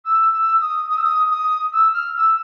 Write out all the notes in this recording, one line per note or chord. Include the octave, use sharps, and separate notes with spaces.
E6
E6
D#6
D#6
E6
D#6
D#6
E6
F6
E6